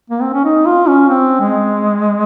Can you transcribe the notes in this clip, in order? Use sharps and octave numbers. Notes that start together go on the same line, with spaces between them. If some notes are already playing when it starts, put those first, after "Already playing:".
A#3
C4
C#4
D#4
F4
C#4
C4
G#3